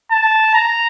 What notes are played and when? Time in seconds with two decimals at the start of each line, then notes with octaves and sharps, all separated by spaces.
0.11 A5
0.54 A#5